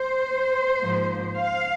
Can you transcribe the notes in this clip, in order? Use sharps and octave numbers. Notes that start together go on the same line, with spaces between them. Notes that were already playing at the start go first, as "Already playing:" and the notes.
Already playing: C5
G#2 F3 A#3
F5